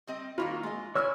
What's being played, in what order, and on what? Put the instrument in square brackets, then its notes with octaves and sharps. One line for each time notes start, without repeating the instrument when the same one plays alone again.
[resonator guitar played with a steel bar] G3 C4 D#5
[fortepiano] D#2 F4 B5 [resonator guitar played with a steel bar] G3 A#3 F#4
[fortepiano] G#3 [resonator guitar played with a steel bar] F4 D#5
[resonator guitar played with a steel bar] E4 G#4 D5 [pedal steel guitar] C#5 E6 F6